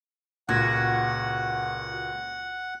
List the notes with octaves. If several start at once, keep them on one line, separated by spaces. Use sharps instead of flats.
C#2 A#2 F#4 F#5 F#6 G#6 A#6